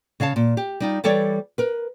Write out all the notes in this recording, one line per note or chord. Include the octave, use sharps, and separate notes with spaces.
C#3 C#5 F5 A5
A#2
G4
G3 D#4 F4
E3 G3 A4 C#5 D5
A#4 B4